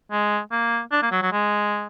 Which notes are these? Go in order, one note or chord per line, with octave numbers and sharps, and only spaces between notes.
G#3
A#3
D4
A#3
F#3
F#3
G#3